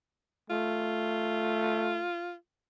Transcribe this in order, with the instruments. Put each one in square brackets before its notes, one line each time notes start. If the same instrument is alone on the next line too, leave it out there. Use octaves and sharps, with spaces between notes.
[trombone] A3 [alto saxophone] F4